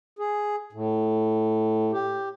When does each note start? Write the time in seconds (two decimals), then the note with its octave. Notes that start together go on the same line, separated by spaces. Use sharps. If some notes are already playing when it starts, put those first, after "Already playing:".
0.19 G#4
0.73 A2
1.92 G4